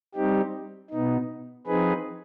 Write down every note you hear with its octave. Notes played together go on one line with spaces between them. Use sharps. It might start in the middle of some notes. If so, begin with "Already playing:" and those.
G3 C4 D#4 G4
B2 B3 D#4
F3 C4 D#4 G#4 B4